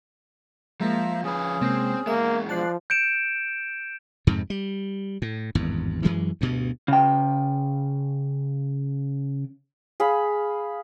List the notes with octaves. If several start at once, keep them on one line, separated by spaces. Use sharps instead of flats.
F3 G#3 A#3 E5 A#5
F3 C#4 G#4 B4
C3 G#3 A#3 C4
E2 G#3 A#3 E5
F3 D5 A5 F#6 C7
G6 C#7 D7 E7
F2 G#2 C3
G3
A2
G#1 E2 G2
F#2 E3 F#3 G#3
D2 G2 B2
C#3 G5
G#4 F5 B5